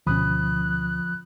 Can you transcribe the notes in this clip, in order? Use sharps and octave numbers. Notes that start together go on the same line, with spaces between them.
D2 B2 F3 C#4 B5 D#6 F#6